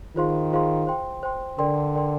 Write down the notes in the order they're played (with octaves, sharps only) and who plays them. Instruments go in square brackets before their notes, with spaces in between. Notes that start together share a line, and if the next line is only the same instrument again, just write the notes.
[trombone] D#3 [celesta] F4 G#4 C5 F5 C6
[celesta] F4 G#4 C5 F5 C6
C5 G5 C6
C5 G5 C6
[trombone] D3 [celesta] A#4 D5 G5 C6
[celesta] A#4 D5 G5 C6